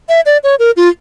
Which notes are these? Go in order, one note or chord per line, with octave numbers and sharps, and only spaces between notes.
E5
D5
C#5
A#4
F4